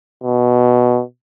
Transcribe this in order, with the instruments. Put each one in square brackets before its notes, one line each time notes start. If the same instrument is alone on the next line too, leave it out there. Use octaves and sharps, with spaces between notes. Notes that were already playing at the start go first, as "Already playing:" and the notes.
[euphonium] B2